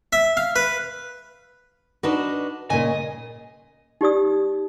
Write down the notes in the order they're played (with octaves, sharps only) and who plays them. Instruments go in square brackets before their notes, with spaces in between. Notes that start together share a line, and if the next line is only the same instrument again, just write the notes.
[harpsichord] E5
F5
B4
[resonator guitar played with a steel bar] D4 D#4 F#4 [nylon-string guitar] B4
[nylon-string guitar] A#2 C#3 [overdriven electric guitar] D#5 [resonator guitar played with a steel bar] G#5
[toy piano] D#4 G4 D5 D#6